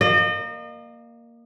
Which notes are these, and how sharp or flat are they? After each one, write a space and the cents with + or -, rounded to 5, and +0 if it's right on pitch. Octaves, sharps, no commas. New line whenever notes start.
A#3 +0 D#5 -35